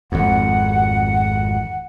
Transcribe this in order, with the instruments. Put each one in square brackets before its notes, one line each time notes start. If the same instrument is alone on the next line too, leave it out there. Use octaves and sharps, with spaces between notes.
[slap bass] G#1 F2 [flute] F#5